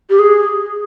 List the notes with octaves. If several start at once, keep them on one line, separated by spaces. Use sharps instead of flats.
G4
G#4